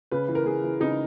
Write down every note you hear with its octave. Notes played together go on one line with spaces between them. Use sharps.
C#3 B4
E3
A#4
C#3 G#4
E3
C#3 D#4